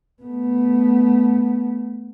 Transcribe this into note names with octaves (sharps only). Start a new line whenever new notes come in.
A3 B3